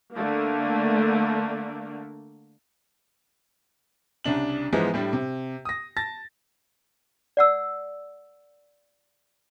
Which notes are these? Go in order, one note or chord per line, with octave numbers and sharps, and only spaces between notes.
D3 A3 A#3
C2 C#3 D4 F#7
G#2 E3 F3 G#3 B3
A2 G3 D4
C3
D#6 A#6
A5 A6 A#6
D5 F#5 E6